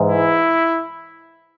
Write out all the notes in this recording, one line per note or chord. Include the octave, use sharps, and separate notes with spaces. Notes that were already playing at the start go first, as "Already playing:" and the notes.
Already playing: G#2 E3
E4